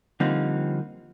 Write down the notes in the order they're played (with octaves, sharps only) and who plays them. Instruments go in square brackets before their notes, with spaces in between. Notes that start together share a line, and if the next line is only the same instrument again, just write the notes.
[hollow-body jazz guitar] D3 F3 G3 A#3 C4 D#4